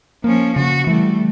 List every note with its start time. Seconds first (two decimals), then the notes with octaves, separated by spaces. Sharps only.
0.24 F3 A#3 C#4
0.56 C#3 F#4
0.87 E3 G3 A3